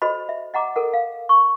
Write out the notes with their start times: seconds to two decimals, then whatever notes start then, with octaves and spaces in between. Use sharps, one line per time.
0.02 F#4 A4 C5 D#5 B5
0.29 E5
0.54 D#5 F#5 A#5 D6
0.76 A4 A#4 F#5
0.94 F5
1.29 C#6